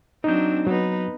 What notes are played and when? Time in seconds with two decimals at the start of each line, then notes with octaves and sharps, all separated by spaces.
0.24 F#3 C4 D4 D#4 G6
0.67 F#3 B3 D#4 B4